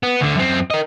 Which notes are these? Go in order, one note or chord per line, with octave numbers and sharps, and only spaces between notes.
B3
D2 D3
F#2 C4
A#4 D#5